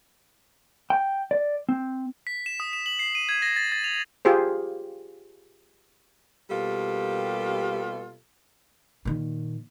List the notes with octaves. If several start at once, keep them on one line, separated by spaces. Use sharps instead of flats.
G5
D5
C4
B6
E7
D#6
E7
F#7
C7
D#7
G#6
A#6
A6
A6
F7
F4 G4 G#4 C5
B2 G3 A#3 F4 G4 A4
A#2 D#3